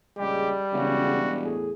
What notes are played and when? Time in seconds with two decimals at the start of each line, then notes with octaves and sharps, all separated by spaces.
0.19 A#1 C#3 G3 G#3 G4
0.73 E1 C#3 F#4
1.42 E2 A2 G#4